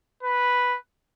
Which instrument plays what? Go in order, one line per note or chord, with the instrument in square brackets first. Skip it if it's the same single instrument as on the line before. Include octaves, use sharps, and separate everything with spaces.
[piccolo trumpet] B4